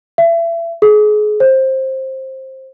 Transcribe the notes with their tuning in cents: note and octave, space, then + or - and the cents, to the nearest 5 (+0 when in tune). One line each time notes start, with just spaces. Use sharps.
E5 +30
G#4 +30
C5 +15